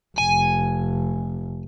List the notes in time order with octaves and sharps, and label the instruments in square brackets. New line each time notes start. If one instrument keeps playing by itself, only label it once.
[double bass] F1 [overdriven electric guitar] G#5